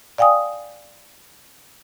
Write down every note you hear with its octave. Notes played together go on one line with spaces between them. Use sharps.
D5 F5 G5 G#5 D#6